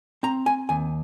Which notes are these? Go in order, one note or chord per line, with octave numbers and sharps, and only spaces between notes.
C4 A#5
G#5
D#2 G#5